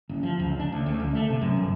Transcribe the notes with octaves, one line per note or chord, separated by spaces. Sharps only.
F#1
F3
C#2
D4
D2
D2
C#2
A3
C3
F#2
G1